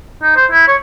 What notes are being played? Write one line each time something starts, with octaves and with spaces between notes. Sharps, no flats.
D#4
C5
E4
C#5